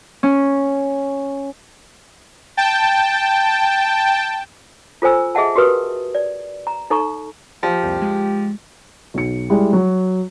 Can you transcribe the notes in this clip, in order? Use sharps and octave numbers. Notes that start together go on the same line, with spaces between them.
C#4
G5 A5
F4 A4 C5 G#5 E6
G#4 D#5 E5 F#5 A5
F#4 G4 A#4 B4 D#6
D5
A#5
D#4 A4 A#5 C#6
F3 G4
C2 F2 A#2
G#3
B1 C#7
G3 G#3 E4
F#3